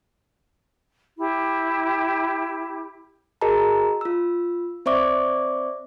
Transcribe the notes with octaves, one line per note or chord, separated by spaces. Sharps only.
E4 G4
F#4 G#4 A#4 D#5 A5 A#5
F4 E6
C4 C5 D5 E5 C#6 D6